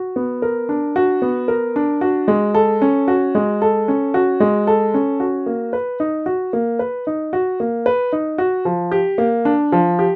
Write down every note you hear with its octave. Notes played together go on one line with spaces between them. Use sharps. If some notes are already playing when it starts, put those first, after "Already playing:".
Already playing: F#4
B3
A#4
D4
F#4
B3
A#4
D4
F#4
G#3
A4
C#4
F#4
G#3
A4
C#4
F#4
G#3
A4
C#4
F#4
A#3
B4
D#4
F#4
A#3
B4
D#4
F#4
A#3
B4
D#4
F#4
F3
G4
A#3
D4
F3
G4